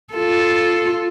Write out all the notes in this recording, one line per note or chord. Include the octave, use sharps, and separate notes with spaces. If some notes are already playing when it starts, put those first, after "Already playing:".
F4 A4